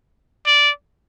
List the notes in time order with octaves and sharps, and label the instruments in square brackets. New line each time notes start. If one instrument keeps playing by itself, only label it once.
[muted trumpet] D5